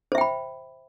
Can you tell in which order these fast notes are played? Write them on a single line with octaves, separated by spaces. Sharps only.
C5 E5 G5 B5